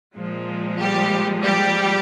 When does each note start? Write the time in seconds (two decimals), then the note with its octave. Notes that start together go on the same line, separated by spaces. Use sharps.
0.16 A#2 F3 G#3
0.80 G3 G4
1.45 G3 G4